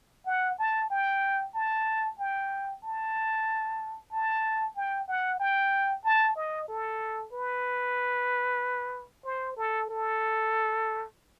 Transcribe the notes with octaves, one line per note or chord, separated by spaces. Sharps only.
F#5
A5
G5
A5
G5
A5
A5
G5
F#5
G5
A5
D#5
A4
B4
C5
A4
A4